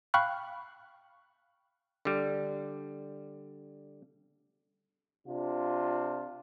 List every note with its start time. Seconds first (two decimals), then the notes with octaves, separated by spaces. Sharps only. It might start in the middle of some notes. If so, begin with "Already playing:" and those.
0.14 F5 G5 B5 C#6 F6 F#6
2.05 D3 G3
5.27 C3 D4 F4